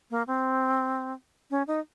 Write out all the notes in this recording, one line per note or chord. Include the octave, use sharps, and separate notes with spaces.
A#3
C4
C#4
D#4